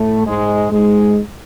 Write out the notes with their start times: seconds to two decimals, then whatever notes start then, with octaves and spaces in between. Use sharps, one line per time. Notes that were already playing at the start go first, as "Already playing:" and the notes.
Already playing: A2 A3
0.26 G#2 G#3
0.72 G#2 G#3